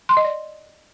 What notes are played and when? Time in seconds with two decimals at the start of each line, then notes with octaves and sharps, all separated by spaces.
0.09 C6
0.17 D#5
0.25 D5